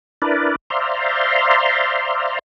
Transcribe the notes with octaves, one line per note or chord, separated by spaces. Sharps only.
D4 E4 A#4 B4 D5
C5 D5 E5 F5 A#5 C6